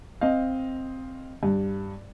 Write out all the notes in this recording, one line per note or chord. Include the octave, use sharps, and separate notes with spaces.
C4 D#5 F5
G2